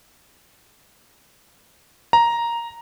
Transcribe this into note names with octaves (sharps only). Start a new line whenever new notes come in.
A#5